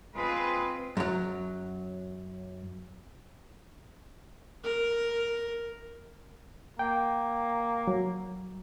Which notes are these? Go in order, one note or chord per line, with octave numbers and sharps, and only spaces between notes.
G#3 C4 F4 B4
F#2 F#3
A#4
A#3 G5
F#3